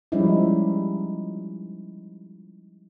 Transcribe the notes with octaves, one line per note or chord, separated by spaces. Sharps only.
F3 G3 G#3 C#4 D#4 E4